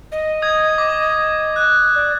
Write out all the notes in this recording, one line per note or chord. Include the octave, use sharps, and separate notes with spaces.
D#5
D#6 G#6
D6
F#6
D5